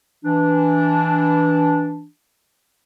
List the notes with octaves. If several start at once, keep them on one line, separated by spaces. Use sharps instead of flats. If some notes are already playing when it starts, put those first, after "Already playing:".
E3 D4